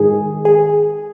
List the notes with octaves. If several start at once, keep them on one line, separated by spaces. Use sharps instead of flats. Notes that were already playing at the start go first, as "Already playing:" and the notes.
Already playing: G#2 D#3 G#4
G#4